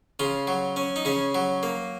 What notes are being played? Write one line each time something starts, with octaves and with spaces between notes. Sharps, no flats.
C#3 F4
F#3
C#4
D#4
C#3 C#4
F#3
A#3